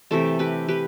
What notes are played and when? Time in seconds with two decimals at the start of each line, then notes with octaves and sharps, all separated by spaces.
0.11 C3 E3 A3 A4 C5
0.39 G4 B4
0.68 G4 B4